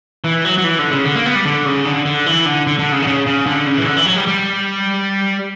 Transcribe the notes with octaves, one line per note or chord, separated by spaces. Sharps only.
E3
F#3
F#3
E3
D3
C#3
D3
A#3
B3
G3
D3
C#3
D3
D3
E3
D3
D3
D3
C#3
D3
C#3
C#3
D3
C#3
E3
D3
E3
F#3
G3
G3